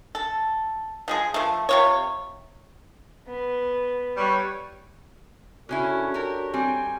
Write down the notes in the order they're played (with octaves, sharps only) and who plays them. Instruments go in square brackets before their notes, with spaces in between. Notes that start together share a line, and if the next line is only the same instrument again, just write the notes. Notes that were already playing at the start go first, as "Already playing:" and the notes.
[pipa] A4
F3 G#3 G#4
F3 A3
C3 F4 C#5
[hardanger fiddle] B3
[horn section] G3 B4 C#5
[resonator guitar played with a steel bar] C#3 C#4 E4 [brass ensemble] D4 A4 C#5 [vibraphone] F#4
[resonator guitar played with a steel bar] G4 A#4
[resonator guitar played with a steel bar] G3 C4 [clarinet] G#5